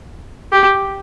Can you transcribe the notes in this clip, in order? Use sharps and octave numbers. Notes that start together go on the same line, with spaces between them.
G4